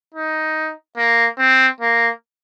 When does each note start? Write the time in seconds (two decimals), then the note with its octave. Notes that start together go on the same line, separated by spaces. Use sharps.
0.14 D#4
0.97 A#3
1.39 C4
1.81 A#3